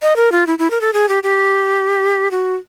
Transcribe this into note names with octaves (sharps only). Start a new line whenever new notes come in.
D#5
A#4
F4
E4
E4
A#4
A4
G#4
G4
G4
F#4